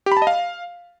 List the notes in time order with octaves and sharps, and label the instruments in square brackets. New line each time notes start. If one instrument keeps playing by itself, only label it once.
[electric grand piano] G4
B5
A5
D#5
F5